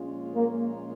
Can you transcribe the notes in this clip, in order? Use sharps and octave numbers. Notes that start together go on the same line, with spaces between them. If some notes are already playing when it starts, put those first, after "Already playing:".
Already playing: A#1 A#2 G#3 C#4 F4
A#3